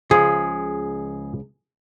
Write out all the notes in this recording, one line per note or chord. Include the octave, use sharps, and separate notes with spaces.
C#2 F3 G#4